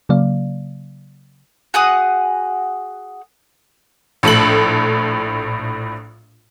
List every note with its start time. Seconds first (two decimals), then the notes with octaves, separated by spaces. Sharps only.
0.09 C#3 F#3 A#3 D5 F5
1.74 F#4 G#4 F#5 D#6
4.23 A#1 A2 A4 F#7